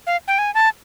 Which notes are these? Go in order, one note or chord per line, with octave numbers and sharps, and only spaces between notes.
F5
G5
G#5
A5